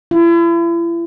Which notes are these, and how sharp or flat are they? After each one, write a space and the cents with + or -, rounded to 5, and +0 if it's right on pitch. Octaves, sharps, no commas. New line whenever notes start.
E4 +40